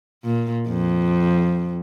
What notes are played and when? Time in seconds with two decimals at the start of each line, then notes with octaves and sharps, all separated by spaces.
0.24 A#2
0.67 F2